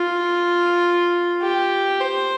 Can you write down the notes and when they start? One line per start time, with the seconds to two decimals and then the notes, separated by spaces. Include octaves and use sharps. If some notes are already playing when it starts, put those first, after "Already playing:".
Already playing: F4
1.42 G4
2.01 C5